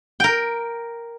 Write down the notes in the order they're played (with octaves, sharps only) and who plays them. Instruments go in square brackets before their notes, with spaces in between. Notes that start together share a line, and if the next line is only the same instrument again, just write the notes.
[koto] A#4 G5